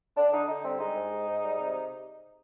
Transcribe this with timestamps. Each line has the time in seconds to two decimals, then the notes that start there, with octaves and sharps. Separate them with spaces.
0.17 D3 D4
0.33 D3 D#4
0.49 D3 D#4
0.65 G3 C4
0.80 G#3 D#4
0.96 G#2
1.12 G#3
1.27 G#2
1.43 G3
1.59 C3